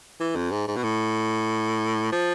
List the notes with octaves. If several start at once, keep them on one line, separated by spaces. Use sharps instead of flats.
E3
F2
G#2
G#2
B2
A2
F3